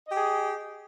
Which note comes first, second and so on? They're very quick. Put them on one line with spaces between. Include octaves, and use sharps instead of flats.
D#5 G4 G#4